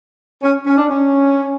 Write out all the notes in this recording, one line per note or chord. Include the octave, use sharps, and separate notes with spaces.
C#4
C#4
D4
C#4